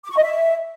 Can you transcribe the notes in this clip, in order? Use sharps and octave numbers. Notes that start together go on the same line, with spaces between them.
D6
C#6
D#5
E5